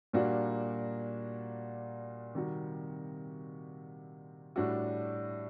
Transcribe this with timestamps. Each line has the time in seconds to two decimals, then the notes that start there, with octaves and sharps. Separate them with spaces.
0.13 A#2 G3 A#3 D4 F#4
2.35 C3 D#3 G3 C4 F#4
4.56 A2 G3 D4 F#4